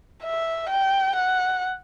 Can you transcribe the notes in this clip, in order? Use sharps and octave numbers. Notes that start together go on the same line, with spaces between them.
E5
G5
F#5